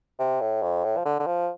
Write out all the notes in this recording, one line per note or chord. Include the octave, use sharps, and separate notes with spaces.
C3
A2
F2
A2
F3
D3
D3
F3